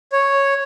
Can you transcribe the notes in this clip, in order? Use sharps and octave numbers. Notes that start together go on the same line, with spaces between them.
C#5